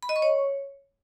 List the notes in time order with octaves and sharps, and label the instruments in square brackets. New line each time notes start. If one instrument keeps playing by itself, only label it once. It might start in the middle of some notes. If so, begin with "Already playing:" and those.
[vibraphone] B5
D#5
C#6
C#5